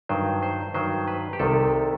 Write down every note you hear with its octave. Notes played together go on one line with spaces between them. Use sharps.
G2 D#3 F#3 C5
C5
G2 D#3 F#3 C5
B4
G4
C2 C3 D#3 A4